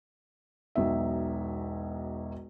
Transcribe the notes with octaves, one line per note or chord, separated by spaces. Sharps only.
E1 B1 D#4 E5